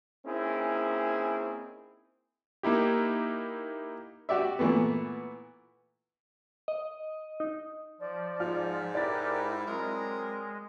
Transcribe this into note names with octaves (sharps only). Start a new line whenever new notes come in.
A#3 C4 C#4 D#4 E4 G#4
A#3 D#4 E4 G4
F#4 G4 D5 E5
A#2 E3 A3 B3
D#5
D#4
F3 D5
G#2 F4 F6
E4 G4 A#4 B4 D5 A6
F#3 G#3 C4 A#4